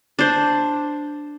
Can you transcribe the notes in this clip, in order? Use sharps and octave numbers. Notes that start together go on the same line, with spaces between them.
D4 C5